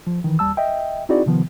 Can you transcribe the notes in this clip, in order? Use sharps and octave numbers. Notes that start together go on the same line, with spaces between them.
F3
D#3 E3
D#2 G3 A5 E6
D#5 E5 G5
C4 D#4 E4 F#4 G#4 D5
C3 D#3 F3 B3